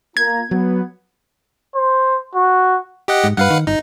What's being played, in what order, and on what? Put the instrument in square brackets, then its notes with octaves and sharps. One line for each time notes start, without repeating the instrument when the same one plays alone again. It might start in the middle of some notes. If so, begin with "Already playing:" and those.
[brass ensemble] A#3 F4 A#5 [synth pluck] G#6
[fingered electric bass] F#3 [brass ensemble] B3
[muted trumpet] C5
F#4
[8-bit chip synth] G4 D#5 F#5
[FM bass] G#2
[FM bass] G2 [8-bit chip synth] B4 F5 F#5
[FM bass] D#3
[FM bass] G1 [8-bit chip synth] D#4